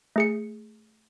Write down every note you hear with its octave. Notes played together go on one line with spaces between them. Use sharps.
A3 G#4 C#7